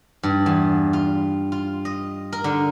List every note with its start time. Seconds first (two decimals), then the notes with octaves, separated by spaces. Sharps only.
0.23 G2
0.46 E2
0.93 F4
1.52 F4
1.85 D#5
2.32 A#4
2.44 D3